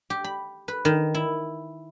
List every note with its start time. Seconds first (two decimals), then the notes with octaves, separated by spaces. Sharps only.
0.10 G4
0.24 B5
0.68 B4
0.85 D#3
1.14 E4